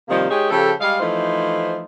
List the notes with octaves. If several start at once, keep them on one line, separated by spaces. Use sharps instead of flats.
C3 D#3 F3 G3 A#3
G#3 D#4 G4 G#4 C#5
C#3 F3 G4 A4
G3 G#3 F5
E3 F3 A3 D#4 C5